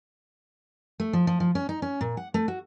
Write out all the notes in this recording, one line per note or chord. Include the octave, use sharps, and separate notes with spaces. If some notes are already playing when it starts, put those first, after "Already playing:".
A3
F3
F3
F3
C#4
D#4
C#4
A#2
F#5
A3
F#4